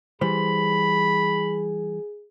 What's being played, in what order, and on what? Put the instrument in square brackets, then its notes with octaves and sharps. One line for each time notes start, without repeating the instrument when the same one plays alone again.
[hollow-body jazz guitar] E3 G3 C5 [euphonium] G#4 [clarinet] B5